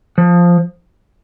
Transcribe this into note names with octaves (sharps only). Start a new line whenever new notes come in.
F3